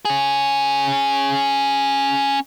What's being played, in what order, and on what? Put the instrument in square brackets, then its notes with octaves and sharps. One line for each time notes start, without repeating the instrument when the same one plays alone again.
[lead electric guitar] C#4 G#4